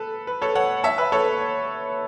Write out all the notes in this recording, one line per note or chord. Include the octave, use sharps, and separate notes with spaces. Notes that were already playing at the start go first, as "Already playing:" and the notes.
Already playing: A4 B4
B4
A4 C#5
C#5 F#5
E5 A5
B4 E5
A4 C#5